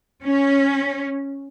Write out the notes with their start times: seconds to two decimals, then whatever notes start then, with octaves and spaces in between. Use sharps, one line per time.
0.24 C#4